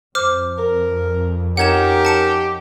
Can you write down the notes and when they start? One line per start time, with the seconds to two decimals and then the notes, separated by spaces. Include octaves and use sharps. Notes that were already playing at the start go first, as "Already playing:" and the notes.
0.15 F2 C5 D6 F6
0.58 A#4
1.57 C#4 D#4 G4 A#4 F#5 G#6 E7
2.05 A5 C#7 E7